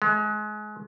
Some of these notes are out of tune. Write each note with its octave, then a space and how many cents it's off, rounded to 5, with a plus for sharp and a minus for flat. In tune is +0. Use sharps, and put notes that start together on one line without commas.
G#3 +30